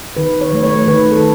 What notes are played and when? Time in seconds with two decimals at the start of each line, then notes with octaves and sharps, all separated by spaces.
0.17 D#3 B4
0.41 C#5
0.52 F#3 A3
0.63 C#5
0.87 D#3 B4
1.11 A4